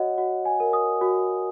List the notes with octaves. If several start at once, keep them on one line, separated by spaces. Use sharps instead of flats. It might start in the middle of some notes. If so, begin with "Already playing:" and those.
Already playing: F#4 C#5 D#5 F#5
F#4 F#5
G#5
A#4
D#6
F#4